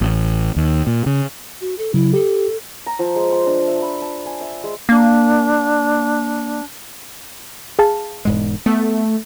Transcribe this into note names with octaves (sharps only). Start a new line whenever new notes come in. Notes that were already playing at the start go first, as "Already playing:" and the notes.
A1
D#2
A#2
C#3
F#4
A4
C#3 F#3 E4
G4 A4
A#5
F3
G#3
C6
D4
E5
B5
A5
G#5
E5
G#3
A#3 D4
G#4 F5 A5
E1 G#2 G#3
A3 B3